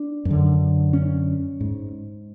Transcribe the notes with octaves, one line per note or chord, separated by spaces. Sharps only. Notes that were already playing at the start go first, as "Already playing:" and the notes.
Already playing: D4
F#2
D3
C#4
G#2